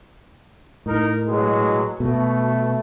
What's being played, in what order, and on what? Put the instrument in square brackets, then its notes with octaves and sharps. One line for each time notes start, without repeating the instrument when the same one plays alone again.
[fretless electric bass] A2 [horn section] D#4 A#4
[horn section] B2 F#3 G#3
[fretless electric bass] B2 [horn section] A3